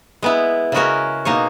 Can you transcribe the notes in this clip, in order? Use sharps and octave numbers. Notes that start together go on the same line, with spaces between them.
G#3 B3 E4
C#3 G#3 C#4 F#4 A#4
B2 A#3 D#4 G#4 C#5